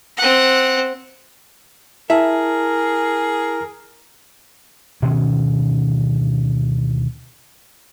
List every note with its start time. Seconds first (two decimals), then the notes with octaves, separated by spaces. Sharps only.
0.18 C4 F#5
2.10 E4 G#4 A#4 E5 A5
5.02 D2 B2 D#3 C#4